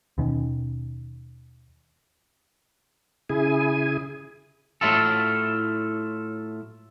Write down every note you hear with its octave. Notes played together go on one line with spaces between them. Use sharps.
D#2 B2 D#3 C#4
C#3 E4 G#4 G#5
A2 F#3 E4 F4 A4